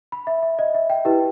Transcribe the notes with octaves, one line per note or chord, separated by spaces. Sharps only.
B5
E5
E5
D#5
E5
G5
E4 G4 B4